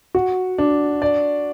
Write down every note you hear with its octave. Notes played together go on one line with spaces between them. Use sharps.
F#4
D4
D5